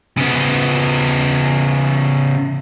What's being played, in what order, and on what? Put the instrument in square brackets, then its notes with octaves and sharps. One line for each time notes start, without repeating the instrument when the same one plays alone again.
[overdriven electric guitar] C#3 B3